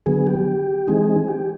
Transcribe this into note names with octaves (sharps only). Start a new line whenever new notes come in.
D3 F#3 B3 G#4
G4
E3 G#3 C4 D#4 G#4
G4